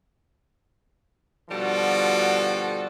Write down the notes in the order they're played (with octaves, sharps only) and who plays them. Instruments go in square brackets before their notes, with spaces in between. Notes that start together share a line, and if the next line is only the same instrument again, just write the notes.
[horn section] B2 D3 F3 G3 F#4 A4